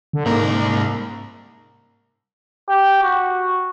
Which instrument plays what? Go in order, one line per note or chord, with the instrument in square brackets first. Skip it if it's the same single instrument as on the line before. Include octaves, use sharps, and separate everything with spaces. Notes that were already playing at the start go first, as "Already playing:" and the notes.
[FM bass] D3
[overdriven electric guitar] C2 A#4 [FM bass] G#2 [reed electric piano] A#3
[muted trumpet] G4
F#4